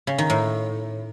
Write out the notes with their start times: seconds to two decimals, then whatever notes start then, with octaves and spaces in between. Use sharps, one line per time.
0.07 C#3
0.18 D#3
0.30 A2